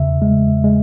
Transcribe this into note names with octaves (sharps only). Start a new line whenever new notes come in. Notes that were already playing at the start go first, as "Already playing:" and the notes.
Already playing: E2 C#3 E5
G#3
G#3